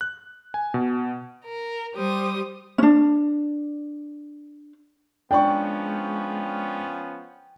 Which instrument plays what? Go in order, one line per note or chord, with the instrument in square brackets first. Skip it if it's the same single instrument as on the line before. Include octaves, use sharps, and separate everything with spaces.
[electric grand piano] F#6
G#5
B2
[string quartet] A#4
G3 G4 C5 D#6
[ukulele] C#4 D4
[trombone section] F3 B3 C#4 [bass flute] G#3 [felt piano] D4 D5 C#6 [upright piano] G5